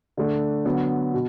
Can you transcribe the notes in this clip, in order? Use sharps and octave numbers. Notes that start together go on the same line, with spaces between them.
D3 A3 D4
D3 F#3 B3
B2